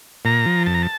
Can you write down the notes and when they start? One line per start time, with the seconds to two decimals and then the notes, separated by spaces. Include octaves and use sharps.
0.25 A#2 A#5
0.46 F3
0.66 F2 A5
0.74 A#5
0.83 A5